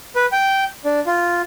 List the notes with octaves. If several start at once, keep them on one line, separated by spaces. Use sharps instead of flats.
B4
G5
D4
F4